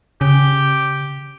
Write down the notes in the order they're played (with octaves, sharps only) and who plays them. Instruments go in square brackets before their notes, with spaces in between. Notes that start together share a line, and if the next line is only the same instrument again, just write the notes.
[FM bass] C#3 [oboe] G4